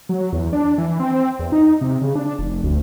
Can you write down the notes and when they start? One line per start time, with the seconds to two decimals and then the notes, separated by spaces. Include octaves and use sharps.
0.09 F#3
0.33 E2
0.53 D4
0.78 E3
1.00 C4
1.39 E2
1.52 D#4
1.81 C3
2.01 C#3
2.15 D4
2.39 F1
2.63 D2